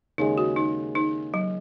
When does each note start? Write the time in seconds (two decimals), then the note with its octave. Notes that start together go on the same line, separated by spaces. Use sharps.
0.18 D#2 C#3 G#3 D#4
0.38 F#4
0.56 D#4
0.95 D#4
1.34 F#3